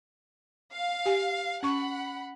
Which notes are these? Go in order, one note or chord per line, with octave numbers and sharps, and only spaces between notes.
F5
G4 G#5
C#4 F#5 B5 C#6